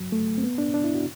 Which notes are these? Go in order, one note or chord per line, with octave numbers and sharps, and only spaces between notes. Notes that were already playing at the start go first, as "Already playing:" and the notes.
Already playing: F#3
A3
C4
B3
D4
D4
E4
F#4